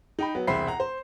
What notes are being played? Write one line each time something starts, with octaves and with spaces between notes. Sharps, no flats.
D#4 G5 B5
F#3 B3
E1 C2 C5 E5 B5 C7
F#5 A#5
C5